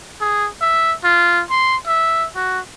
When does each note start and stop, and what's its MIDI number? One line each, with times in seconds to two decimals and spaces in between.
0.21 0.48 68
0.61 0.94 76
1.04 1.42 65
1.50 1.77 84
1.87 2.26 76
2.36 2.60 66